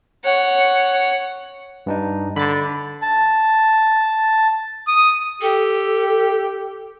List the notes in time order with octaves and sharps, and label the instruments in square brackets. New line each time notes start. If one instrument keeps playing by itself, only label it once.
[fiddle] C#5 F#5
[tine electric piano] G2 D4 D#4
[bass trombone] D3 [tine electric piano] B5 A6
[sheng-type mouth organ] A5
[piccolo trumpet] D#6
[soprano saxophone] G4 [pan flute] A4